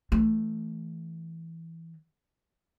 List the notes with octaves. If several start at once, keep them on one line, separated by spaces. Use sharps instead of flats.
E3 A3